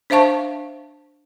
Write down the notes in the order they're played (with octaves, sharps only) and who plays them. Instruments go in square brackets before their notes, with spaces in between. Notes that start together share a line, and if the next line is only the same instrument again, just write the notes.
[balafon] D4 C5 E5 F5 A5 C#6